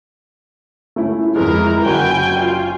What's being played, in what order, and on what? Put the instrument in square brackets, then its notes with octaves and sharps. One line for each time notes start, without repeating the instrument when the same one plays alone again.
[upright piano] A3 C#4 E4
[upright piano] F2 G#3 [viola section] E4 A#4
[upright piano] F#1 F#4 B5 [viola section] G5 G#5
[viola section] F4